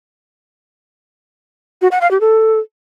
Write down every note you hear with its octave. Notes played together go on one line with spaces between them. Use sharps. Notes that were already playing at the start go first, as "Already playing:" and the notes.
F#4
F#5
F5
G4
A4